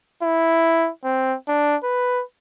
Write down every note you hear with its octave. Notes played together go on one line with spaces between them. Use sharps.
E4
C4
D4
B4